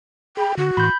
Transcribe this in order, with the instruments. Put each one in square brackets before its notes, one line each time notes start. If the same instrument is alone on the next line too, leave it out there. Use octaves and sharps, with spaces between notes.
[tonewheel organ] G#4 B5 [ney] G5
[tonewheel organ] D3 [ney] F#4
[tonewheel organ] A2 E3 C6 [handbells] B5 G6